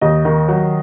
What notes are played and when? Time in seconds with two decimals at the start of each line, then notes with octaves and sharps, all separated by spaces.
0.01 D#2 D#5
0.25 D#3
0.48 F#3